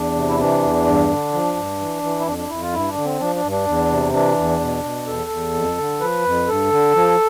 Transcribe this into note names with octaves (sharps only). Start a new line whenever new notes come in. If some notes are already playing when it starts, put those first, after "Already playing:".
Already playing: E2 D4
C3
E4
E3 D4
E2
G2
D3
F3
G2
E3
E3
E4
F2 D4
D4
F2 E4
F4
G2 E4
D4
D3
C4
F3 D4
D4
G2
D4
E2
C3
E3 D4
E2
B2
B2
E2 A4
E2
F2
D3
F3 B4
F2
G2 A4
D3
F3